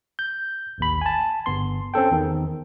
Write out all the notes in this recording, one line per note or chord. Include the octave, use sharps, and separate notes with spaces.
G6
A1 D#2 B5
G#5 A5
G1 B3 C6
C4 C#4 A4 G5
E2 D#3